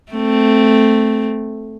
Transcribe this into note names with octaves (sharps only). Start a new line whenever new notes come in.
A3 C4